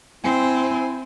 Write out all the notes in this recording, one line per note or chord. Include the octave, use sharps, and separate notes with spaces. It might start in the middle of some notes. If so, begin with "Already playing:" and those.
C4 E4 G#5